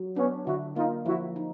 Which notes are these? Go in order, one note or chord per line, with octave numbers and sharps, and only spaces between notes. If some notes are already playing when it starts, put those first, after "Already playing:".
Already playing: F#3
B3 C#4 D4
D3 E4 F#4
A#3 D#4 F4
F3 E4 F#4
D#4